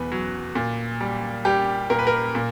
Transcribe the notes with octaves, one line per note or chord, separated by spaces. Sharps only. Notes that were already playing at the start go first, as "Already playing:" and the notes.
Already playing: E2 B2 B4
F#3
A#2
G3
G3 G4
A#2 A#4
B4
A#4
A#2